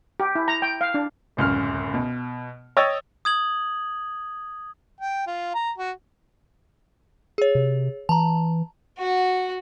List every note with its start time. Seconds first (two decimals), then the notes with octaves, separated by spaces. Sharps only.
0.20 G4
0.35 E4
0.48 A#5
0.62 G5
0.81 F5
0.94 D4
1.37 D1 C#2 F#2 F6
1.94 B2
2.77 C#5 D#5 G5 D#6 E6 A6
3.25 D#6 G#6 F#7
5.01 G5
5.27 F4
5.55 A#5
5.78 F#4
7.38 G#4 C#5
7.55 C3
8.09 E3 A5 A#5
8.98 F#4 F#5